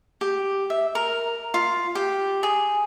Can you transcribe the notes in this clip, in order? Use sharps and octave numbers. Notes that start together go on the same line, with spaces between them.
G4
E5
A#4
F4
G4
G#4